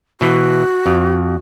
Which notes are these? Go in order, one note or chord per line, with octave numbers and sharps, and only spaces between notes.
B2 E3 F#4
F2